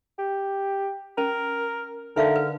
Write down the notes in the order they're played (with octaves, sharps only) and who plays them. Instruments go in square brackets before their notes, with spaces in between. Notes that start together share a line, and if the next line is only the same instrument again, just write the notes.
[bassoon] G4
[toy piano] C#4 [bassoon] A#4
[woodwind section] D3 [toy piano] D#4 E5 F5 [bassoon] A#4
[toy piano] B4